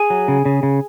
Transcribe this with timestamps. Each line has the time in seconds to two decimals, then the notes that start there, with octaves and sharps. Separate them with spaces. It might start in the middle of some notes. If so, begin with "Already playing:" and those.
Already playing: G#4 G#5
0.10 F#3
0.28 C#3
0.45 C#3
0.63 C#3